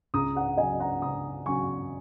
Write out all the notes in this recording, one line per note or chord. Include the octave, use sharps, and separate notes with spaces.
C#2 A#5 D#6
F#5 A#5
C#3 F#3 D#5 G#5
F#5 A#5
C#2 A#5 D#6
C#3 F#3 G#5 C#6